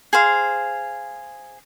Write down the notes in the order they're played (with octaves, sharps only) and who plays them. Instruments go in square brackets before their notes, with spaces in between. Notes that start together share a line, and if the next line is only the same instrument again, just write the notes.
[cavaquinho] G#4 C5 F5